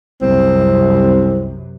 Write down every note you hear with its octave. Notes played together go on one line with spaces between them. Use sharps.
C2 F#2 C3 C4